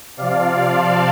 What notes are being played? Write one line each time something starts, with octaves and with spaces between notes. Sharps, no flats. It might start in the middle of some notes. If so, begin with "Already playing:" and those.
C3 F3 D5 F5
A5 C6